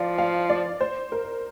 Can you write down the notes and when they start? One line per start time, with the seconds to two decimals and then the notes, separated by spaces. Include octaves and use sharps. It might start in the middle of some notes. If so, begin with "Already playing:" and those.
Already playing: F3 D5 F5
0.18 F5
0.49 D5
0.81 C5
1.12 A#4